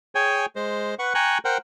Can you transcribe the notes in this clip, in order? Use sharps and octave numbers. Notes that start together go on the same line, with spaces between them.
G#4 C#5 G5 G#5
G#3 C5
B4 F#5 C#6
G5 G#5 A#5 C#6 F#6
A#4 C5 F#5 G5